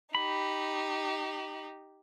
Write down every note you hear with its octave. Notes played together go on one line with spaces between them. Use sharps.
D#4 G4 B5